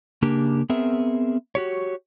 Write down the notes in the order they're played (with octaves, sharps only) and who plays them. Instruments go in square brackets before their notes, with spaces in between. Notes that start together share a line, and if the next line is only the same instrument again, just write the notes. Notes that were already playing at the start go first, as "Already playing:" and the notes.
[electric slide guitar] C#3 A#3 D4 G4 A#4
B3 C4 G#4 A#4 E5
F#4 G4 C#5